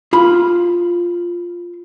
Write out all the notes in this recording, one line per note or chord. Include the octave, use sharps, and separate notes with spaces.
F4 B5